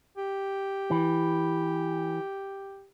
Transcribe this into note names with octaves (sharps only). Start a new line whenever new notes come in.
G4
E3